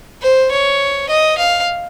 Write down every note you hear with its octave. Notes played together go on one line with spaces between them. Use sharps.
C5
C#5
D#5
F5